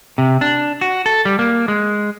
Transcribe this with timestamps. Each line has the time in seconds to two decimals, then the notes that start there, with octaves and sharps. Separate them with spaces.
0.18 C3
0.41 D4
0.81 F#4
1.06 A4
1.25 G3
1.39 A#3
1.68 G#3